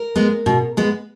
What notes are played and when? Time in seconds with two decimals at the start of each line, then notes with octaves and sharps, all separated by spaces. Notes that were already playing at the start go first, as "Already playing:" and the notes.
Already playing: A#4
0.16 G#3 B3
0.46 B2
0.77 G#3 B3